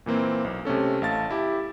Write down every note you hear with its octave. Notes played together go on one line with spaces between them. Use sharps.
A#2 E3 A#3 C4
B1
C3 A3 C#4 A4
A1 A3 F5 A5 A6
E4 G4